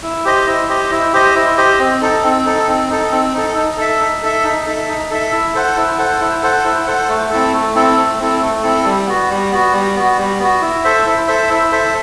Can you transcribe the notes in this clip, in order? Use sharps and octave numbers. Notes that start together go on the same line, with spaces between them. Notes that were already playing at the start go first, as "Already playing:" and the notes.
E4
G4 C5 D#5
E4
G4 C5 D#5
E4
G4 C5 D#5
E4
G4 C5 D#5
C4
D#4 A4
C4
D#4 A4
C4
D#4 A4
C4
D#4 A4
D#4
A4 E5
D#4
A4 E5
D#4
A4 E5
D#4
A4 E5
E4
A4 C5 F#5
E4
A4 C5 F#5
E4
A4 C5 F#5
E4
A4 C5 F#5
A3
C4 E4 A4
A3
C4 E4 A4
A3
C4 E4 A4
A3
C4 E4 A4
G3
B3 F#4
G3
B3 F#4
G3
B3 F#4
G3
B3 F#4
E4
A4 C5 E5
E4
A4 C5 E5
E4
A4 C5 E5